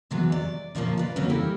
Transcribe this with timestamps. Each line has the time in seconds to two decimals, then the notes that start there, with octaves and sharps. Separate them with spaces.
0.11 C3 E3 F#3 G#3 B3
0.32 D5
0.75 A#2 C#3 F3 G3 A#3 C#4
0.97 B4 D5
1.16 C#3 F#3 A#3 C4 C#4 F#4
1.30 E3 G3 E4 G4 A4 A#4